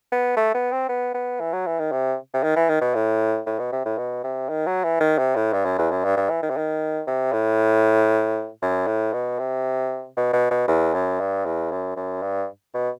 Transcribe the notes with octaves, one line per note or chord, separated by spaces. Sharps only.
B3
A3
B3
C4
B3
B3
E3
F#3
E3
D#3
C3
C3
D#3
E3
D#3
B2
A2
A2
B2
C3
A2
B2
C3
D#3
F#3
E3
D#3
C3
A2
G2
F#2
E2
F#2
G2
G2
E3
D#3
C3
D#3
C3
A2
F#2
A2
B2
C3
B2
B2
B2
E2
F#2
G2
E2
F#2
F#2
G2
B2